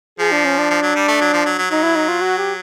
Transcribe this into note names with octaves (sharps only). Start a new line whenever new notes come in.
F3 G#4
D4
C#4
D4
F3
F#3
G3
A3
F#3
F3
F#3
F#3
F#3 D#4
E4
D#4
F4
F#4
G4